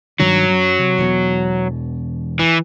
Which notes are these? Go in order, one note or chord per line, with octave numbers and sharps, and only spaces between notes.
G2 D#3 F#3 D4
F#2
C3
E1 E2 B2
E3